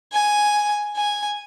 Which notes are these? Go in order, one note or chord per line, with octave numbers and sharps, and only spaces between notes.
G#5
G#5